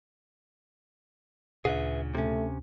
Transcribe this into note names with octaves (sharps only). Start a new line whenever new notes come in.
D2 A#2 C#3 G#4 B4 E5
C3 A3 C#4